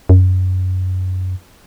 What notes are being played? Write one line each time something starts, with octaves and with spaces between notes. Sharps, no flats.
F#2